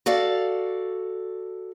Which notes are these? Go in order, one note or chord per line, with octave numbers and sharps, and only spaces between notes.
F#4 A4 D5 F5